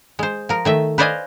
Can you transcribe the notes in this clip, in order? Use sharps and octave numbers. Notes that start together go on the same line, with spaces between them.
G#3 C5
F3 A#4
D#3 A3 E5
B4 C5 D5 D#5 F5 G#5